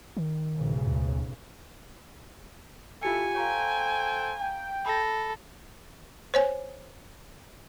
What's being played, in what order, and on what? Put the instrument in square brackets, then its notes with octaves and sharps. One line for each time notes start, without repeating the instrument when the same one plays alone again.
[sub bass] D#3
[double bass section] B1 G#2 C#3
[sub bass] D2
[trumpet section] E4 A4 [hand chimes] F4 G4 C#7 [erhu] G#5
[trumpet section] A4 C5 G5 [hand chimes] F5 A#5 C#6
[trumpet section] G5
[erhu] A4 [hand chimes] B5 A#6
[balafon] C5 C#5 G#5